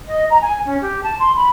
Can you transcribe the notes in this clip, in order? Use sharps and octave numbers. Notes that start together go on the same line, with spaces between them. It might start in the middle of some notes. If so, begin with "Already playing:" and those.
D#5
A#5
G#5
C#4
G4
A5
C6
B5